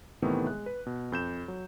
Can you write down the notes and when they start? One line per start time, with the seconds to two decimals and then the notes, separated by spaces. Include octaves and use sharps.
0.22 A2 C3 D#3 E3 A3 B3
0.47 G#3 F#6
0.66 B4
0.86 B2
1.12 F2 G6 E7
1.48 F#3